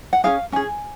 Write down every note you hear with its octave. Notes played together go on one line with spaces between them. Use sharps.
F#5
C#4 F4 G#4 F5
C#4 G#4 G#5